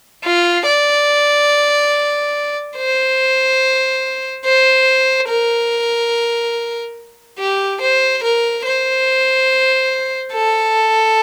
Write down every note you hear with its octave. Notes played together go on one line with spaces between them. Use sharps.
F4
D5
C5
C5
A#4
G4
C5
A#4
C5
A4